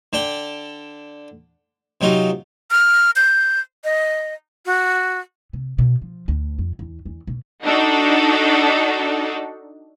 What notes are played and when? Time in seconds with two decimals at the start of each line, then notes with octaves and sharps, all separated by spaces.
0.13 D3 D4 D5 G5
2.01 C3 F#3 D#4 F4
2.71 F6
3.16 G6
3.84 D#5
4.66 F#4
5.53 C3
5.78 B2
6.02 F3
6.28 D2
6.59 F2
6.79 E2
7.06 E2
7.27 B2
7.64 D4 D#4 F#4 A4